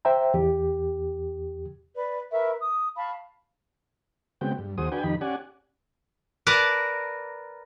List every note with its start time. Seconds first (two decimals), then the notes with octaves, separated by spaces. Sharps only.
0.05 C5 E5 G5 A#5
0.34 E2 G4
1.95 B4 D5
2.31 A#4 B4 E5 C#6
2.58 D#6
2.95 F5 A5 B5 C#6
4.41 C#3 G#3 B3 C4 F#4 G5
4.58 G2
4.78 D#2 F#4 G#4 C5 D#6
4.92 D4 F#4 B4 G5 G#5
5.04 F2 D#3 D#4 G4 B5
5.21 C#4 G4 D5 F#5 G#5
6.47 A#4 B4 D5 A5 A#5